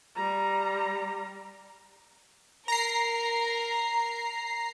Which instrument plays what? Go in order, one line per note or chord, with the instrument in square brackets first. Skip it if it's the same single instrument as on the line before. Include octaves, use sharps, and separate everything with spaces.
[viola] G3 A#5
[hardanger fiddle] A#4 [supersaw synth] A#5 C7